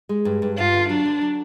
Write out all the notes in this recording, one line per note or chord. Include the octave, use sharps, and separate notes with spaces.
G#3
G2
G2
G2 F4
D3
F#3 D4
D3
F#3